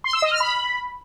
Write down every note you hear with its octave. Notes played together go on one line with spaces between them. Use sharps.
C6
E6
D#5
F6
B5